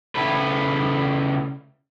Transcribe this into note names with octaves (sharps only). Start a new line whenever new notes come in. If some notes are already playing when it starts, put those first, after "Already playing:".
C#3 E4 A4 B4